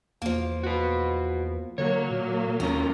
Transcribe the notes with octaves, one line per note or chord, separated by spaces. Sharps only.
E2 F3 A#3
F#4 B4
D3 F#3 A#3 C#5
A#2
D#2 D#3 C#4 F4 A#5